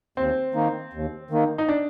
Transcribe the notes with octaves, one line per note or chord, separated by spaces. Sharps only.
D#2 C4
D#3 A#3 D#4
D#2
D#3 A#3 D#4
D#4
D4